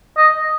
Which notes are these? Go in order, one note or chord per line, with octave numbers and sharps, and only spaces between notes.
D#5